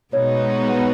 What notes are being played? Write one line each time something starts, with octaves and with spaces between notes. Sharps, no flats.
B2 G#3 B3 D#4 F#4 C#5